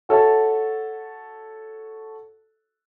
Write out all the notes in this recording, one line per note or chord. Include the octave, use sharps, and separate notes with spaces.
F#4 A4 C#5 E5 A5